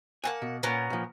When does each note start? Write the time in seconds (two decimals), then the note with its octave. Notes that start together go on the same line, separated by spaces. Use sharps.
0.24 A#3 C4 F#5 G#5 A5
0.42 B2
0.63 A#2 B3 C#4 A#4
0.90 A#2 F3